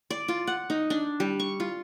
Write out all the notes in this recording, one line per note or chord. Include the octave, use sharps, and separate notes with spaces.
D5
F4
F#5
D#4
D4
G3
C#6
F4